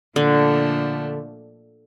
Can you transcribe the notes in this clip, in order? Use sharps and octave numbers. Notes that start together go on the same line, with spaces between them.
A#2 D3 F3 A3 D4